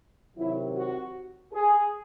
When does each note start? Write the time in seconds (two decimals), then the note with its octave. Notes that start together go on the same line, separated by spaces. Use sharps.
0.37 C3 D#3 F#3 E4
0.76 F#4
1.53 G#4